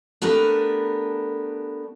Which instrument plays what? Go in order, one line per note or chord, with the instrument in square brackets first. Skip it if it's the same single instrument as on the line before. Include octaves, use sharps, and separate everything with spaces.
[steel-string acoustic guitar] A3 B3 D4 G4 A#4 B4